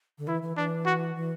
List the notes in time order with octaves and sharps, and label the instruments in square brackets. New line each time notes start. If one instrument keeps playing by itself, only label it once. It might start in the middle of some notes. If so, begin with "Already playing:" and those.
[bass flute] D3
[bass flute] E3 [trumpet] E4
[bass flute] E3
[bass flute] E3 [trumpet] D4
[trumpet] F#4
[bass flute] E3